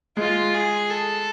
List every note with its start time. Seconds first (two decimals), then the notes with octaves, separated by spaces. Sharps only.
0.17 G#3 F4
0.54 G#4
0.90 A4